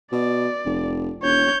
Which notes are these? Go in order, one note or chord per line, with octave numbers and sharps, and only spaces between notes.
B2 D5
F1
E1 C#5 G6